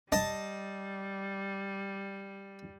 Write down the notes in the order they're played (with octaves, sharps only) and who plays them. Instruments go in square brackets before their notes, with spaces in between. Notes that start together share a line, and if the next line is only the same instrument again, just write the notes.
[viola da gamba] G3 [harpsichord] D#5 A5